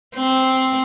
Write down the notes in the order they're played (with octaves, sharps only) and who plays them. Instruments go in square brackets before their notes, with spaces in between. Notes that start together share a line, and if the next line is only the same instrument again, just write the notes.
[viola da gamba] C4